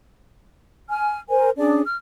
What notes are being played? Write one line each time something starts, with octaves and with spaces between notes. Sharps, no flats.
G#5 F6
A#4 C5 G#5
C#4 D4 G#4 D5
F6